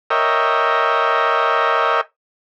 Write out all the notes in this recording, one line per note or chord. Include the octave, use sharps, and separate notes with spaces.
A#4 C#5 D#5 E5 G5